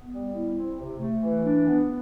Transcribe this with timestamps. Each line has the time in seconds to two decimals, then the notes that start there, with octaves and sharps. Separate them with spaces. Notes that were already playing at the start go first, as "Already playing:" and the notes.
Already playing: B3
0.13 G3
0.34 E4
0.56 C4
0.79 C3
1.00 A3
1.22 E3
1.44 D4
1.66 B3